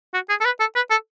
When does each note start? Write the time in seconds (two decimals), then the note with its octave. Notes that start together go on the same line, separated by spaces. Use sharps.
0.14 F#4
0.29 G#4
0.41 A4
0.45 B4
0.60 A4
0.75 B4
0.90 A4